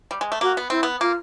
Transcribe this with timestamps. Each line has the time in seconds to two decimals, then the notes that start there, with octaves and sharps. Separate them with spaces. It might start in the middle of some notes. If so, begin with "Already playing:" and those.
0.11 G3
0.21 G#3
0.32 A3
0.41 A#3 F#4
0.57 B3
0.70 C4 E4
0.83 B3
1.01 A#3 F4